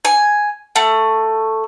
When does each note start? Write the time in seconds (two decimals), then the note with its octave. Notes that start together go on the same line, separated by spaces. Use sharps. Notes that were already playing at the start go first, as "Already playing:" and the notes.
0.05 G#5
0.76 A3